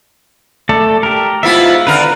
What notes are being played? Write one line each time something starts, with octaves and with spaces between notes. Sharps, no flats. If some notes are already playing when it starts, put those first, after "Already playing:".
A3 A4 D5
G4 A#4
G#2 B3 E4 F4 E5
D3 A#4 B4